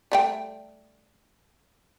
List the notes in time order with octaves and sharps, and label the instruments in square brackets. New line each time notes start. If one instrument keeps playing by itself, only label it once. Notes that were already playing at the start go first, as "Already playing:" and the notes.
[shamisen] G3 A3 G5